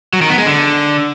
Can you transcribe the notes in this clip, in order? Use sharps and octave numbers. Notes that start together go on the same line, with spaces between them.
F#3
D#3
B3
G#3
D3